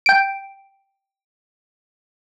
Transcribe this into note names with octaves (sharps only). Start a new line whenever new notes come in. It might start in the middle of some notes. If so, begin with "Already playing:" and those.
G5 D7